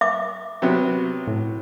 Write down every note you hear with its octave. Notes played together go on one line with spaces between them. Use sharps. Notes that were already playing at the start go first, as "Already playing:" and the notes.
E5 D6
C3 F#3 B3
A2